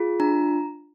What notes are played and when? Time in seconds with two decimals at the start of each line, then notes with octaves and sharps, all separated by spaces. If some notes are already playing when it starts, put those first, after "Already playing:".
Already playing: F4 G#4
0.20 D4 A#5